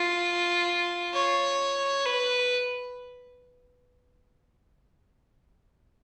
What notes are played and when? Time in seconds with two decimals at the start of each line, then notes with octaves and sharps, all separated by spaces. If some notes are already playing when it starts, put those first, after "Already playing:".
Already playing: F4
1.14 C#5
2.06 B4